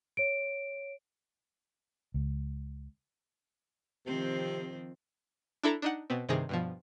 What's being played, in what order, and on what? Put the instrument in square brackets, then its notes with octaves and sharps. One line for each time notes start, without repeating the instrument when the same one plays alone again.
[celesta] C#5 D7
[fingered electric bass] C#2
[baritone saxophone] C3 [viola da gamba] D#3 F3 C4
[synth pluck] D4 E4 A4 A5 A#5
D4 D#4 F#5
B2 B3 C4
G2 C3 D#3 G#4 A#6
G2 B2 F3